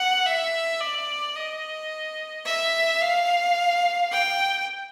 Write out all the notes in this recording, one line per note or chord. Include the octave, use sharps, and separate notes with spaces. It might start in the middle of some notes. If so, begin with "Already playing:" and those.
Already playing: F#5
E5
D5
D#5
E5
F5
G5